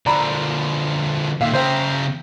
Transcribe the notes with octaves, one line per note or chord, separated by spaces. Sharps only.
D3 F3 D5 A#5 B5
A#2 D#3 E5 F5
C#3 A#4 C5 E5 G5